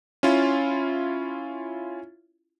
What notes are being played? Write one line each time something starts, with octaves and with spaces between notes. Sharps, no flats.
C#4 E4 F4